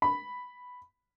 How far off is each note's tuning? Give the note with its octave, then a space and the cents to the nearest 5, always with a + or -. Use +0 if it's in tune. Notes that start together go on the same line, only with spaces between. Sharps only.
B5 +0